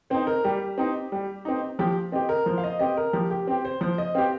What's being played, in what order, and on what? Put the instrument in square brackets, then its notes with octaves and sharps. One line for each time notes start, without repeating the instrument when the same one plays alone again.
[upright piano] C4 D#4 [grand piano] C5
[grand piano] A#4
[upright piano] G3 [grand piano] G4
[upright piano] C4 D#4
G3
C4 D#4
[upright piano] F3 [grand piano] G4
[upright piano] C4 G4 [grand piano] D#5
[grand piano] A#4
[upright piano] F3 [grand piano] C5
[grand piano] F5
D#5
[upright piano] C4 G4 [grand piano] D#5
[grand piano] A#4
[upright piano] F3 [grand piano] G4
[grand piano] G4
[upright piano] C4 G4
[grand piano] C5
[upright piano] F3 [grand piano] C5
[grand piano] D#5
[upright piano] C4 G4 [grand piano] F5